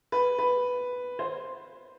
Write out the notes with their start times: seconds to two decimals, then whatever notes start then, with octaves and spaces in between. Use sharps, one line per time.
0.12 B4
0.39 B4
1.19 C5